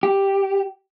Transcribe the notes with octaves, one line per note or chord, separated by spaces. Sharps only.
G4